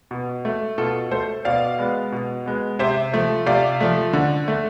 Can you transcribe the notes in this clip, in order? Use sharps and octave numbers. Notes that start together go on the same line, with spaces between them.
B2
A3
B2 F4 A4
A3 A4 C5
B2 D5 F5
G#3 B3
B2
G#3 B3
C3 C5 E5
F3 A3
C3 D5 F5
F3 A3
D3
A3